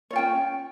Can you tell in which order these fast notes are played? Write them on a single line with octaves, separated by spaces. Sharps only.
C#5 F4 G5 C#4